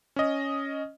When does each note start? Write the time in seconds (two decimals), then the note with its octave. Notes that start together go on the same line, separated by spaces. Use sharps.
0.16 C#4 D#5